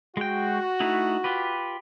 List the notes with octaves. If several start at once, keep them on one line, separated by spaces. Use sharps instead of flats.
G#3 F#4 G5
A3 D#4 E4
F4 G4 B4